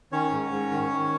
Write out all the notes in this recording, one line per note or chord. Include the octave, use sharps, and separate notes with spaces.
D#3 C#4 C#5
G#2
G#2
D#3
D#3